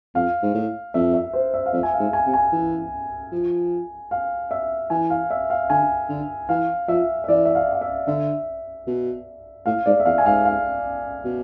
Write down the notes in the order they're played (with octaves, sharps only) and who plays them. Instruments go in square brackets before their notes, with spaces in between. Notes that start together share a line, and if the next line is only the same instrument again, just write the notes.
[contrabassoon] F2 [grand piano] F5
[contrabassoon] G#2
A2
[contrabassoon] F2 [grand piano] E5
[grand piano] E5
C5
E5
F5
[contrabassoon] F2 [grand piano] E5
[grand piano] G#5
F5
[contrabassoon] G#2
[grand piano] G#5
[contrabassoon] C3
[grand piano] G#5
[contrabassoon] E3
F3
[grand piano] F5
E5
[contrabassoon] E3 [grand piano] G#5
[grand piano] F5
E5
F5
[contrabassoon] D3 [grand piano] G#5
[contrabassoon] D3
[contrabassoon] E3 [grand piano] F5
[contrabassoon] F3 [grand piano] E5
[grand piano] E5
[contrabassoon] E3 [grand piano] D5
[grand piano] E5
F5
F5
E5
[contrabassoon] D3 [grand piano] E5
[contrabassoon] B2
[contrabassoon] A2 [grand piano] F5
[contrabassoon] G#2 [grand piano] D5
[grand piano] E5
[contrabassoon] E2 [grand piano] F5
[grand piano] G#5
[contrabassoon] G#2 [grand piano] F5
[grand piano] F5
[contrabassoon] B2